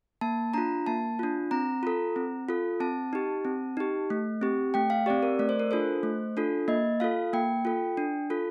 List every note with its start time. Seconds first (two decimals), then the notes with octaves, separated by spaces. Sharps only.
0.21 A#3 A5
0.54 D4 F4 A#5
0.87 A#3 A5
1.19 D4 F4
1.51 C4 A#5
1.83 F4 A4
2.16 C4
2.49 F4 A4
2.80 C4 A5
3.13 D#4 G4
3.45 C4
3.77 D#4 G4
4.10 A3
4.41 C4 G4
4.74 A3 G5
4.90 F5
5.06 C4 G4 D5
5.23 A#4
5.39 A3 D5
5.49 C5
5.60 A#4
5.71 D4 F4 A4 C5
6.03 A3
6.37 D4 F4 A4
6.68 A#3 D#5
7.00 F4 A4 F5
7.33 A#3 G5
7.65 F4 A4
7.97 D4
8.30 F4 A4